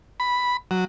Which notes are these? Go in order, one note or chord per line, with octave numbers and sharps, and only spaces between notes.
B5
F#3